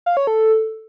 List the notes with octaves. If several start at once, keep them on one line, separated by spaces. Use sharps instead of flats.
F5
C#5
A4